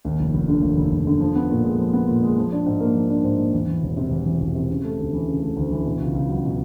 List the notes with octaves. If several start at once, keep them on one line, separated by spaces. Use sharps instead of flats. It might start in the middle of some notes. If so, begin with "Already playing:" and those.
D#2
F1
F1
D3
D#2
F1
F1
D3
F3
B3
A#2
G#3
F3
B3
A#2
G#3
F3
D4
G#2
A#3
F3
D4
G#2
A#3
E2
E3
E1
C3
E2
E3
E1
C3
C#3
A3
D2
E3
C#3
A3
D2
E3
B2
C#2
C#2
F#3
B2